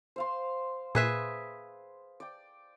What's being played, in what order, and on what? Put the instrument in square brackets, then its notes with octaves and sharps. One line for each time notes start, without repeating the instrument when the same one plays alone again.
[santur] C5 F5 C6
[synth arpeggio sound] A#2 [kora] G#4 B4 E5
[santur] D5 G5